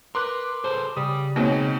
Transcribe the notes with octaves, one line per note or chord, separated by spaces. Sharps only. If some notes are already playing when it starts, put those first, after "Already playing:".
A#4 B4 C6 D6 F#6
G#4 A4 B4 C5
C#3 G3 D#6
B2 G#3 A#3 C4 D#4 C#5